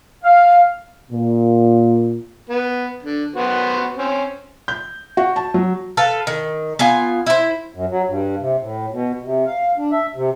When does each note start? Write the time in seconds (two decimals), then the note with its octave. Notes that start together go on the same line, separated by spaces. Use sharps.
0.24 F5
1.11 A#2
2.50 B3
3.03 D3
3.36 B3 F#4 C5
3.98 C4 C#4
4.68 G6
5.17 F#4
5.36 A5
5.54 F#3
5.97 A4 B4 F5
6.27 D#3
6.79 B3 F4 G#5
7.26 E4 C5
7.74 F#2
7.90 F#3
8.08 G2
8.40 C3
8.60 A2
8.91 B2
9.24 C3
9.46 F5
9.77 D4
9.92 E5
10.15 C3